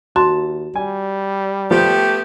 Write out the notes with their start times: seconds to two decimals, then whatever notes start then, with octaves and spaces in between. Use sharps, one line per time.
0.16 D#2 F#4 A5 C6
0.76 G3 G#5
1.71 F3 A3 B3 G4